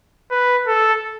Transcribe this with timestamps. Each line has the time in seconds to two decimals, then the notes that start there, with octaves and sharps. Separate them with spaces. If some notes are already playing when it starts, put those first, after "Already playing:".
0.31 B4
0.67 A4